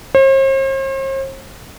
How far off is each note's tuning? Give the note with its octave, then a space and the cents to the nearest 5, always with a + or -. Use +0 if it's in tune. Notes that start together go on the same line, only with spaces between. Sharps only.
C5 +45